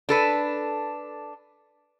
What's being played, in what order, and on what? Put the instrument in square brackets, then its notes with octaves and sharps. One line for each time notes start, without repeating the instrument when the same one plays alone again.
[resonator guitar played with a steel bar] D4 A4 B4